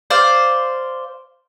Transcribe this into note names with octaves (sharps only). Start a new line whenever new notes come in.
C5 D5 F5